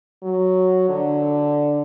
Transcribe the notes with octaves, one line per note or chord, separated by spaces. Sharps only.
F#3
D3